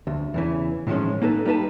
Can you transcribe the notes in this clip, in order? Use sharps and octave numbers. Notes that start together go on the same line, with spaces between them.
D2
E2 C#3 E3
A2 D#3 F3 F#3 G#3 C#4
A#3 D#4 A4 B4
G3 A#3 D#4 B4 A5